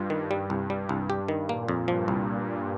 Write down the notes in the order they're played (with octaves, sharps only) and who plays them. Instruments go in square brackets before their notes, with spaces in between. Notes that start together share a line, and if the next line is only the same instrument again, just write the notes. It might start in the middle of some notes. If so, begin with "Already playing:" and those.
Already playing: [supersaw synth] G2 [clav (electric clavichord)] F4
[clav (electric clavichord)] D#3
[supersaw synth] G2 [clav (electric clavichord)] G3
[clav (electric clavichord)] C2
G3
C2
G4
D#3
[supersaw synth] A#2 [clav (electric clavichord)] A#3
[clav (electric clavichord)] F2
[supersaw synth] G2 [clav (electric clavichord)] F3
[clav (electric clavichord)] C2